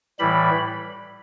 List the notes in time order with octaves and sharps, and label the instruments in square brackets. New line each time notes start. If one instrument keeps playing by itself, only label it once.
[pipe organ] A2 E3 G3 B5